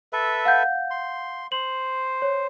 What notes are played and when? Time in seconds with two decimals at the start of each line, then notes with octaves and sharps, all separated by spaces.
0.13 A4 B4 E5
0.45 F5 F#5 G6
0.91 C6
1.52 C5 F#7
2.22 C#5